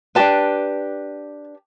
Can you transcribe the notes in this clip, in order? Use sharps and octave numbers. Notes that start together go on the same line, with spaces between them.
D4 G4 B4 A5